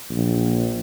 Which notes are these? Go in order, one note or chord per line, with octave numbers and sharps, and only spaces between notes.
A#1